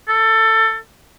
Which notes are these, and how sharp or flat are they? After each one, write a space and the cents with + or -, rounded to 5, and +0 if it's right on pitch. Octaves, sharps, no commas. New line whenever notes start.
A4 +20